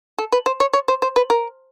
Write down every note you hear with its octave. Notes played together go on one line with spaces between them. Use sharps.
A4
B4
C5
C#5
C#5
C5
C5
B4
A#4